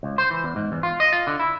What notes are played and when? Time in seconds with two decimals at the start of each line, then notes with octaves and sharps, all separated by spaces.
0.03 C#2
0.18 C5
0.30 E3
0.44 E2
0.56 G#2
0.72 E2
0.83 F4
1.00 D#5
1.13 F4
1.27 D3
1.40 E4